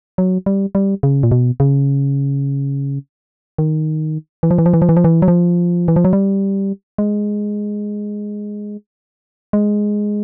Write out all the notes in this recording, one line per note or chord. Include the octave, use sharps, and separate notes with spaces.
F#3
G3
G3
C#3
A#2
B2
C#3
D#3
E3
F3
E3
F3
E3
F3
E3
F3
E3
F#3
F3
E3
F3
F#3
G3
G#3
G#3